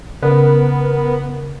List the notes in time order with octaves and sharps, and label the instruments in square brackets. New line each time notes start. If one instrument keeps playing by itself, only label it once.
[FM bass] C#3 [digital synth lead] B3 [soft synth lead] A#4